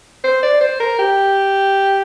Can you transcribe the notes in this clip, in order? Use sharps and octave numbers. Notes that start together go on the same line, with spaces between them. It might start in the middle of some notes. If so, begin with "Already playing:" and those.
C5
D5
C5
A#4
G4